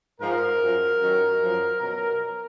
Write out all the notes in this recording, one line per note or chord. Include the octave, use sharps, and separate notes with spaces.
G#2 F3 A#4
F#2 F3
F#2 D#3 F#3
F#2 F3
B2 F#3 A#4